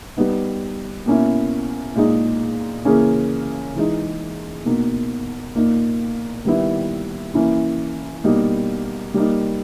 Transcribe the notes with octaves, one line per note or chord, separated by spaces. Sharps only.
G3 B3 D#4
B2 A#3 C#4 E4
A#2 G#3 D#4
C#3 E3 A#3 C#4
E3 G#3 D#4
B2 A#3 D#4
A#2 A#3 D#4
D#3 G3 B3 E4
E3 A#3 C#4 E4
B2 G3 A#3 D#4
G3 A#3 D#4